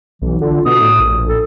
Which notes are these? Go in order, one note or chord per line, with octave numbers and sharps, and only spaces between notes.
B1 E3
D3 F4
B2 D#6
A2
A#1
A4